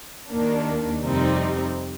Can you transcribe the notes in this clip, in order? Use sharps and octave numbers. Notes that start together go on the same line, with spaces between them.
D#2 D#3 A#3 D4
F2 C3 G3 C4 D#4